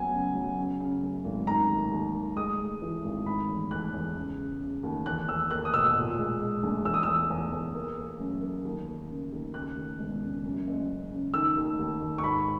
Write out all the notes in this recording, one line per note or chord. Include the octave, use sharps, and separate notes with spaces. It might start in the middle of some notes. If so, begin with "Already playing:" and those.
Already playing: F#1 F#3 B3 G#5
C#3
F#3
C#3
C#3
F#2
G#1
D#3 A#5
D#2
D#2
D#3
G#3 D#6
G#3
E3
G#1
D#3 B5
E2
E2 F#6
E2
C#3
C#3
C#3
D#2
E2 F#6
E2 E6
A#3 F#6
D#6
B2 E6
A#2
G#3
G#3
A#1
E2 E6
D#6
E2 E6
E2
E2
A#3
A#3
F#2
A#3
D#2
A#3
C#3
D#2
C#3 F#6
D#2
E1
C#3
F#2
F#1
C#3
C#3
D#3 E6
D#2
D#2
D#2
C#6
G#2 B5